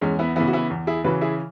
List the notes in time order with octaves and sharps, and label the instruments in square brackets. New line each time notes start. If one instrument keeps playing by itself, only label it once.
[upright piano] E2 G#3 C#4
B3 E4
C#3 E3 B3 E4
F#4
B3 E4
E2
E4 G#4
C#3 E3 F#4 B4
E4 G#4